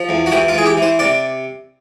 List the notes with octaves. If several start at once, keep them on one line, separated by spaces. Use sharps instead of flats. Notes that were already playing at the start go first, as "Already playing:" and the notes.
Already playing: F3
E2
F#4
E3 G4
F4
E3 G#4
G4
E3
C5
C3 D5